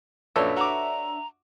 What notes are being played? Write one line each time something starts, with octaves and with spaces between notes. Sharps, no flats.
A#1 F#2 D4 A4 B4 C#5 E5
F#4 A#5 D6